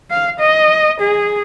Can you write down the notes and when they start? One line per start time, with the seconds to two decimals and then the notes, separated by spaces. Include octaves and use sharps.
0.10 F5
0.39 D#5
1.00 G#4